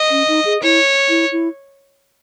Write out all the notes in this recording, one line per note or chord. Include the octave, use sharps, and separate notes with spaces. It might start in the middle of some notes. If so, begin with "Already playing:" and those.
Already playing: D#5
C#4
D#4
G#4
E4 C#5
E4
E4